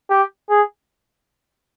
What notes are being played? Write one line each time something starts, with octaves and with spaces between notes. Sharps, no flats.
G4
G#4